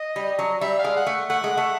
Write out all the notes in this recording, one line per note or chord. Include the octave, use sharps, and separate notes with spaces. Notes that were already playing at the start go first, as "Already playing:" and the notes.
Already playing: D#5
G3
F#3
G3 E5
F5
G#3
F#5
A3
A3 F#5
G#3
A3